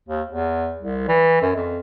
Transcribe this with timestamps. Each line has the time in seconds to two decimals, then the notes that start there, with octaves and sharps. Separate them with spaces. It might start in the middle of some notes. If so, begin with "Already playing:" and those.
0.08 D#2
0.27 E2
0.81 C2
1.09 E3
1.42 F#2
1.55 F2